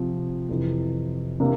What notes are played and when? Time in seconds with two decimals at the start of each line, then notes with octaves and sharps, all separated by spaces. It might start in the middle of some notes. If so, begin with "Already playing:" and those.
Already playing: C3 F3 C4
0.49 F2 C3 E3
1.40 C3 E3 A#3 D4